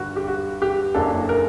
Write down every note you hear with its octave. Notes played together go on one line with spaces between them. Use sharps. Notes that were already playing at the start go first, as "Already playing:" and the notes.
Already playing: G2 D3 G3 F#4
G4
F#4
G4
F#1 F#2 F#3 A#3 D4 A4
A#4